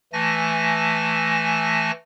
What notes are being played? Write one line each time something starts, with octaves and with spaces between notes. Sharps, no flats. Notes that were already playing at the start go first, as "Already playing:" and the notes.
E3 A3 G#5 A5 A#6